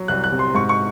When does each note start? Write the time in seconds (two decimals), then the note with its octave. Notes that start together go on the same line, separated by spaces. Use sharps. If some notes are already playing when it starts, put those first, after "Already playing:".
Already playing: F#3
0.08 C2 F#6
0.24 F#6
0.32 C3
0.39 C6
0.55 G#2 C#6
0.69 C#6